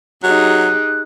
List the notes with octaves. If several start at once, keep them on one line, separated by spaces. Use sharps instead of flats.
F#3 D#4 G4 G#4 F#6